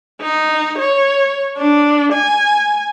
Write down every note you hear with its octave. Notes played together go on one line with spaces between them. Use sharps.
D#4
C#5
D4
G#5